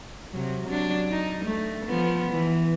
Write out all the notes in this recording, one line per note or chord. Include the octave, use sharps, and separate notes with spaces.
C3 F#3
F#3 D4
D#4
A3
F3 B3
E3